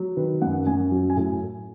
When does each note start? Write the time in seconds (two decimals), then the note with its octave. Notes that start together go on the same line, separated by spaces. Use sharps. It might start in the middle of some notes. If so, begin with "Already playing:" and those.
Already playing: F#3
0.16 D#3 B4
0.42 F#2 F#5
0.66 F#2 G#5
0.91 F#3
1.10 G#5
1.17 A2